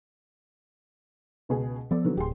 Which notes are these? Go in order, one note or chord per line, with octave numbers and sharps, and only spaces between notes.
C#2 B2 G#4
F3 B3 A4 D5
D3 E3 F#3
D1 G4 G#4 C6